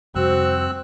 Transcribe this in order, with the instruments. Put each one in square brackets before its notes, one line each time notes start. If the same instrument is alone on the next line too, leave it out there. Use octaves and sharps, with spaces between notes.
[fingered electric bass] F2 C3 G3 [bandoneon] C4 E6 F#6 [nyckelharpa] F#4 [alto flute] C5